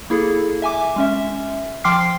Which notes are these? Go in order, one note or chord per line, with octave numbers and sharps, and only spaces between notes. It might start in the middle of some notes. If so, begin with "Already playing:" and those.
A#3 E4 G#4 A4
E5 G#5 D6
G#3 C#4 E5
F3 G5 C6 D6 F6 C7